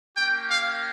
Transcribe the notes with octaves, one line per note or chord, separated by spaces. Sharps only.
A#3 C#4 G4 G5
F5